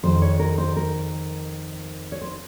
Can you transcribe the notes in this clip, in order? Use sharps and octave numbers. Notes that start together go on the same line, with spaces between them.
F2 D#3 G#3 C5
C#5
A#4
C5
A#4
C#5
C5